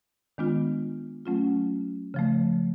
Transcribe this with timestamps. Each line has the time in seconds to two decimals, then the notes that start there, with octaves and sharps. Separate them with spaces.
0.38 D#3 G#3 B3 D4 F4
1.26 F#3 A3 C#4 F4
2.14 C#3 F3 A3